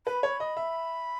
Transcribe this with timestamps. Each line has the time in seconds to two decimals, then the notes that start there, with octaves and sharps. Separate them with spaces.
0.06 B4 B5
0.23 C#5
0.40 D#5
0.57 E5